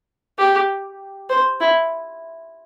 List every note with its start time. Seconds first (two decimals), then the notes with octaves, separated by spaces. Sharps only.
0.38 G4
1.30 C5
1.61 E4